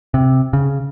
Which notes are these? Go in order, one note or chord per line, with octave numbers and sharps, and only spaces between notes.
C3
C#3